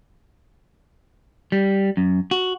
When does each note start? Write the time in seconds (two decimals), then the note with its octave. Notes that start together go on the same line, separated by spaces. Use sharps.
1.52 G3
1.97 F#2
2.31 F#4